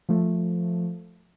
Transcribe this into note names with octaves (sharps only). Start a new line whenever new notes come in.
F3 A3